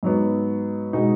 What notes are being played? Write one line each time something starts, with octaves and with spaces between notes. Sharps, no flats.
G#2 F#3 B3
B2 G#3 D#4 F#4